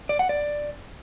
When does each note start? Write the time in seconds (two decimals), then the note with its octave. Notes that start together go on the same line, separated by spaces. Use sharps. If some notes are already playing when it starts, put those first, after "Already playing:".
0.09 D5
0.19 F#5
0.29 D5